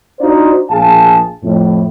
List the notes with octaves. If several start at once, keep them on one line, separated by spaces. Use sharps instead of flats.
D4 D#4 F4 F#4 C5 D5
A#1 G#4 F5 A5
F2 A2